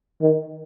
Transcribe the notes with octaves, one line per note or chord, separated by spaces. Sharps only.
D#3